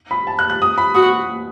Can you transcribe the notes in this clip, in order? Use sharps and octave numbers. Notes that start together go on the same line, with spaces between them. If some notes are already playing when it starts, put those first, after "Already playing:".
B5
A5
F#6
F#6
D#6
B5
F#4 D#6